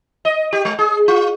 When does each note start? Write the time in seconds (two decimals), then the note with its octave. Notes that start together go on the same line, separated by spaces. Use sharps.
0.25 D#5
0.53 G4
0.65 G#3
0.79 G#4
1.08 F4